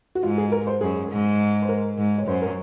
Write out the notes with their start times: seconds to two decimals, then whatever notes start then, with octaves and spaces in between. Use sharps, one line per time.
0.15 F#4
0.23 G#2 F4
0.38 G#4
0.52 A#4
0.67 C5
0.81 F#2 G#4
1.10 G#2
1.62 C5
1.69 A#4
1.98 G#2
2.18 C#5
2.27 F#2 C5
2.42 A#4